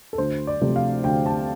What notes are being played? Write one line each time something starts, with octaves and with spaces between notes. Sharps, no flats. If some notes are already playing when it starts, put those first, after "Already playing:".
A4
D2 C5
D5
C3 F3 A3
F5
D2 G5
A5